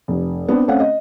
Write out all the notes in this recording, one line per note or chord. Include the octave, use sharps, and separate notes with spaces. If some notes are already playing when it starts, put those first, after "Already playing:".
F1
B3 C4 D4
A3 C4 C#4 F5 F#5
D#5